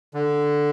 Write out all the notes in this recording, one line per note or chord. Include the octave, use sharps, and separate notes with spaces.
D3